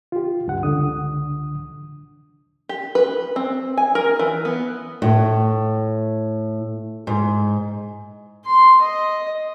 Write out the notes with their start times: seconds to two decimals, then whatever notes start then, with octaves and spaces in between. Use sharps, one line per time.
0.12 F4 G4
0.46 D2 G2 F#5
0.63 C#2 D3 D#6
2.69 G4
2.95 B4
3.36 C4
3.77 G#5
3.95 A#4
4.19 E3
4.45 B3
5.02 A2
7.07 G#2
8.45 C6
8.82 D#5